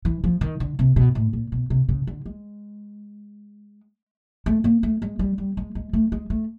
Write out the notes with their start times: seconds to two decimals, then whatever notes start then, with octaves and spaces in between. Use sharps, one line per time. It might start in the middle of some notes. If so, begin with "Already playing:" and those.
0.05 E3
0.24 F3
0.41 D#3
0.60 D3
0.79 C3
0.96 B2
1.15 A2
1.33 A#2
1.52 B2
1.70 C3
1.89 C#3
2.07 D3
2.26 G#3
4.46 A3
4.64 A#3
4.83 A3
5.02 G#3
5.19 G3
5.38 G3
5.57 G#3
5.75 G#3
5.93 A3
6.12 G#3
6.30 A3